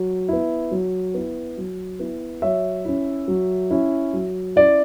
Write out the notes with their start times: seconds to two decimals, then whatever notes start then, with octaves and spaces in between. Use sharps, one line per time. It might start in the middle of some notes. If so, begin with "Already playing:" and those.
Already playing: F#3
0.29 B3 E4
0.71 F#3
1.14 B3 E4
1.58 F#3
2.00 B3 E4
2.42 F#3 C#5 E5
2.85 C#4 E4
3.28 F#3
3.71 C#4 E4
4.13 F#3
4.56 C#4 E4 D5